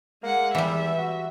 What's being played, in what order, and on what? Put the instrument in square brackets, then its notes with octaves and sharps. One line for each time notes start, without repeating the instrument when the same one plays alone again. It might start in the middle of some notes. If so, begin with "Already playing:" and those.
[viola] G#3 F#5 [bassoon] A#3
[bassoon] E2 [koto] E3 G3 [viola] E5
[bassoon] F#4